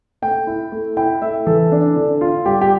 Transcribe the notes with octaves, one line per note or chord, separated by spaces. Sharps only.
A3 G5
E4
A3
E4 G5
A3 E5
E3 A4
D4
D3
F4
G3 G4
G4